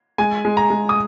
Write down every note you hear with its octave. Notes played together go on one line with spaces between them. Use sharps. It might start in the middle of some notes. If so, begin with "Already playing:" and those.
G#3 G#5
G#3
A#5
G#3
D#6